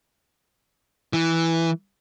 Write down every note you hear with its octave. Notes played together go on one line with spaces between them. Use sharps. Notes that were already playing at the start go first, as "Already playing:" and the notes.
E3